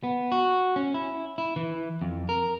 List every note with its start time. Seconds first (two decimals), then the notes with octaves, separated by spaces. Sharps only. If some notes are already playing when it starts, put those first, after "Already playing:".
0.03 B3
0.32 F#4
0.76 C#4
0.94 E4
1.38 E4
1.56 E3
2.02 F2
2.29 A#4